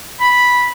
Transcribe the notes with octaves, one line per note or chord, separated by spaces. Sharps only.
B5